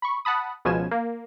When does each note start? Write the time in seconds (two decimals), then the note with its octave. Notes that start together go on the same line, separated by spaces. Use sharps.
0.02 B5 C#6
0.25 F#5 A5 B5 D#6
0.65 C#2 B2 F3 C#4 G#5 E7
0.91 A#3